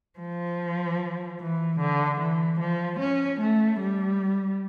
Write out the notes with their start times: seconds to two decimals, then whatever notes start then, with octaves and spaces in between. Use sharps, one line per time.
0.19 F3
1.40 E3
1.80 D3
2.20 E3
2.60 F3
2.99 C#4
3.41 A3
3.80 G3